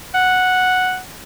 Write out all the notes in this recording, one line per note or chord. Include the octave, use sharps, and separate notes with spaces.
F#5